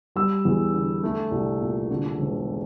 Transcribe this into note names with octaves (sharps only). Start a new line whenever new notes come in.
G3 E6
E2
D3
A3
C2
A#2
D3
E1